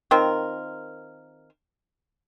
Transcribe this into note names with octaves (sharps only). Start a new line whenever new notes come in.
D#3 C4 F4 A#4